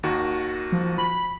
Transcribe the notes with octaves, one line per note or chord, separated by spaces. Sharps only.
D#2 D#3 F#4
F3
B5